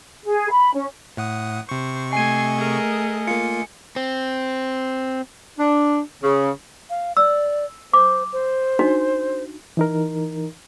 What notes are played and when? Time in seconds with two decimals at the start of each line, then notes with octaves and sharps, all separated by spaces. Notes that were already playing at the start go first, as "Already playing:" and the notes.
0.25 G#4
0.50 B5
0.74 C#4
1.17 A2 F#5 D#6
1.69 C3 C5 C#6
2.13 A3 D#5 G#5 G#6 C7 D#7
2.58 G#4 A#4
3.27 A#3 F4 C#7
3.96 C4
5.58 D4
6.22 C#3
6.90 F5
7.17 D5 E6
7.93 C5 D6
8.33 C5
8.79 D4 D#4 F#4
9.77 E3 D#4 A#4